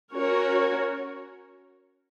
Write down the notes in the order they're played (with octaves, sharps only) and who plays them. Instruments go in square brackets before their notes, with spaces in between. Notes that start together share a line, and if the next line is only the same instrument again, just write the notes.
[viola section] C#4 F#4 A#4 C#5